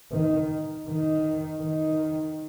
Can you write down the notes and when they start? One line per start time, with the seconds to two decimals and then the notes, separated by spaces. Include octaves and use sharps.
0.12 D#3
0.88 D#3
1.61 D#3